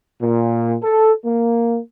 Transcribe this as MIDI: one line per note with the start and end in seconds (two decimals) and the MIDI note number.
0.21 0.75 46
0.81 1.10 69
1.25 1.78 58